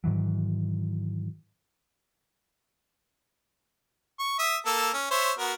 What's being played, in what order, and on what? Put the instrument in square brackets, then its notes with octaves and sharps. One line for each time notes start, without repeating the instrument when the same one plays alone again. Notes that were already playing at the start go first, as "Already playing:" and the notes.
[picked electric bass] G#2 D#3 E3 F#3
[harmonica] C#6
E5 D#6
A#3 A4 E6
C#4
C5 C#5 E5
B3 F#4 A#4